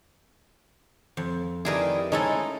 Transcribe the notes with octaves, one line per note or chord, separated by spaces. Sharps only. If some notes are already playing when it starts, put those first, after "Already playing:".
F2
D#3 G3 E4 G#4 A#4 B4
G#3 C#4 D#4 E4 A4